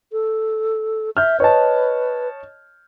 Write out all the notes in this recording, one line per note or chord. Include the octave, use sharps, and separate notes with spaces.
A4
E5 F6 G6
B4 C#5 D#5 A5